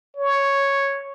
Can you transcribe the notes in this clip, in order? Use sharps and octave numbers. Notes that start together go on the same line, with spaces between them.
C#5